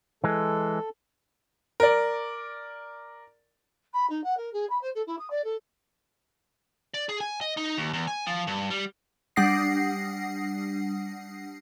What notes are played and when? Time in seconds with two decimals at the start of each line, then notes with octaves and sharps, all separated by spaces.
0.24 E3 G#3 A4
1.80 A#4 D5
3.93 B5
4.09 D#4
4.23 F#5
4.36 A#4
4.52 G#4
4.69 B5
4.81 C5
4.94 A4
5.06 E4
5.18 D#6
5.30 D5
5.44 A4
6.94 D5
7.09 G#4
7.20 G#5
7.41 D#5
7.57 D#4
7.77 D#2
7.93 E2
8.07 G#5
8.27 F3
8.47 G2
8.70 G3
9.36 G3 D4 F#5 D#6 A#6 C7